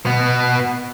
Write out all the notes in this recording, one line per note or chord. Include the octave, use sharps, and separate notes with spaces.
B2 B3